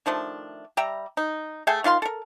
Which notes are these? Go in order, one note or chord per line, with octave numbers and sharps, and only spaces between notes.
D#3 F3 A3 D4
G3 E5 G5 A#5
D#4
A3 G#4 A4 G5
D#3 F4 F5 C6
A4 A#4